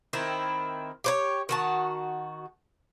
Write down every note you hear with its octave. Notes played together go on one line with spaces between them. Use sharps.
D#3 C4 E4
G4 C5 C#5
D#3 F#4 A5